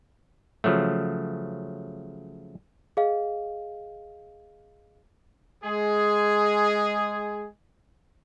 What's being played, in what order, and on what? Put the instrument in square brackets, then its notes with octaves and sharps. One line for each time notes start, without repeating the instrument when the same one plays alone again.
[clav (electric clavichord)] C#3 F3 F#3 A3
[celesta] G#4 D#5 F5
[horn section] G#3 G#4